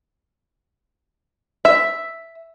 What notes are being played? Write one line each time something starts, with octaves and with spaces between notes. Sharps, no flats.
E5